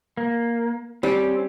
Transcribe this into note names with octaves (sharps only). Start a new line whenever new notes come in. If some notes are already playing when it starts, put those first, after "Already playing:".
A#3
G3 C4 C#4 G4